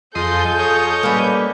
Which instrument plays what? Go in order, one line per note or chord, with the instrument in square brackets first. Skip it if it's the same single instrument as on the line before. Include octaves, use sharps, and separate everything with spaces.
[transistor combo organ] F2 D#5 C6 [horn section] F4 G#4 [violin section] A4 G6
[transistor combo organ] C#5 D#5
[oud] G3 A#3 [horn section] C#4 G4 B4